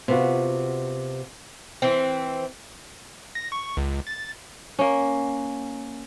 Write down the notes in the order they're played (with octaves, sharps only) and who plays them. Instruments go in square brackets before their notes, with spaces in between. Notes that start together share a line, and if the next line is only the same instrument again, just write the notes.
[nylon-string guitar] C3 B3 F4 F#4
[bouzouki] E3 C4
[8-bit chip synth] A#6
C#6
C#2
A6
[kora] A#3 C#4